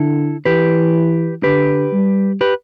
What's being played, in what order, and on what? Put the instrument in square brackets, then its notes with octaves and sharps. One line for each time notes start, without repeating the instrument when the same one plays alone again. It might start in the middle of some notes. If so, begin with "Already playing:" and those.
Already playing: [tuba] D3 [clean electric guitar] E4 A4
[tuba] E3 [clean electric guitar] G4 B4
[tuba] D3 [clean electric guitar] G4 B4
[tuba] G3
[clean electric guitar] G4 B4